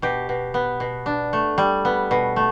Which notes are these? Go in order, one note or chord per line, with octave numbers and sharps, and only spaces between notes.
B2 G4
B2
B3
B2
D4
A3
G3
B3
B2
A3